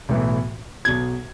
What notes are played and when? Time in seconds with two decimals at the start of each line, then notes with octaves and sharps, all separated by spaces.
0.09 B1 A2 E3
0.85 B1 B2 G#6